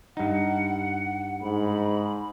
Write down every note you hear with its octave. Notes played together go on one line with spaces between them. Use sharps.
G2 D#4 F#5
G#2 B5